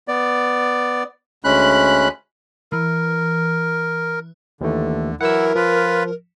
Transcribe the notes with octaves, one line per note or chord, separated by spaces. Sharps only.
B3 D5
D2 G#3 C#4 B5 F#6
E3 A#4
D#2 D3 E3 A3
E3 F#3 E4 A#4 F#5 E6
F3 F4 B4